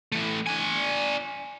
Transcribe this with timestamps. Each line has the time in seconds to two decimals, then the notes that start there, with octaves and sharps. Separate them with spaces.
0.12 E3 A3
0.47 D4 G#5